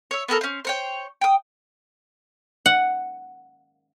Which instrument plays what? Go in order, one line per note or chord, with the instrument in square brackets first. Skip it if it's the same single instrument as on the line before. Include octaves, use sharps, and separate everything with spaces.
[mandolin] C#5 E5
B3 G4 A4 A#4
C#4 C5
C5 C#5 G5
G5 D#6
[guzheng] F#5